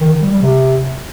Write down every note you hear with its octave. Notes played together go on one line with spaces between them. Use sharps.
D#3
D#3
G3
G3
C3